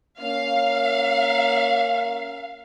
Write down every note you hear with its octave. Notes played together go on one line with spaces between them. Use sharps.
A#3 C#4 F5